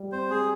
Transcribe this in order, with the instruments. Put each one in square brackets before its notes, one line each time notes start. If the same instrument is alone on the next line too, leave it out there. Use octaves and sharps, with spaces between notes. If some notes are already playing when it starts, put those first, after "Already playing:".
Already playing: [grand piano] G3
[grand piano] C4 [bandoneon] C5
[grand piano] G3 [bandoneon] G#4